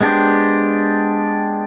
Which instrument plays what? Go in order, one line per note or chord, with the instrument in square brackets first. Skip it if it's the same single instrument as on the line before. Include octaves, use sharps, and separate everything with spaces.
[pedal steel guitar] G#3 B3 D4 G4 C5